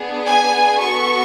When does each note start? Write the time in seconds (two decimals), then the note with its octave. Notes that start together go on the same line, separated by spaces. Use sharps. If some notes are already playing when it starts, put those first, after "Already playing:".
Already playing: B3 D4 G#4
0.27 G#5
0.81 B3 F#4 A4 C#6